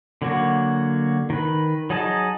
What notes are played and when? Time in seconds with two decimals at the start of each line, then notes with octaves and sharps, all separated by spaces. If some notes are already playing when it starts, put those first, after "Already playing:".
0.22 D3 F#3 A#3 F#4
1.30 D#3 B4
1.90 F#3 D#4 G#4 D#5 A5